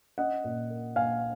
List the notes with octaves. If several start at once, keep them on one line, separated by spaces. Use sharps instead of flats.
C#4 D#5 F#5
A#2
A#3
A#2 F5 G#5